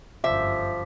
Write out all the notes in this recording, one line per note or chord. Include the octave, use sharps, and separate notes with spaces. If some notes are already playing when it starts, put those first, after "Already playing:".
G1 F#2 F3 E5 D6 B6